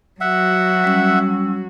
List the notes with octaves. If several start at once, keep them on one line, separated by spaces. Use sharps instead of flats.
F#3 F#4 E5 F#5
G3 C#4 E6